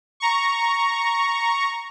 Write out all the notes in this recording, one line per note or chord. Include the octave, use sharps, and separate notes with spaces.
A#5 C#6